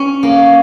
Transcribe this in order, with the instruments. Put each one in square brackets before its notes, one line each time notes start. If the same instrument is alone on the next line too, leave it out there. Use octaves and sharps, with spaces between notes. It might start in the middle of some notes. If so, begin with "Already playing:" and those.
Already playing: [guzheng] C#4
A#3